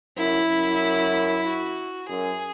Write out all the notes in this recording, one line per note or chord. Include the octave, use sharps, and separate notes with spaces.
F#2 E4
F#2
F#4
F#2 G#4